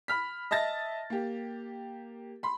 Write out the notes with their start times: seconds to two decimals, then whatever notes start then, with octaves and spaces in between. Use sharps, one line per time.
0.08 B5 F6 B6
0.51 D#5 E5 A5 A6 A#6
1.10 A#3 G4
2.43 B5 C6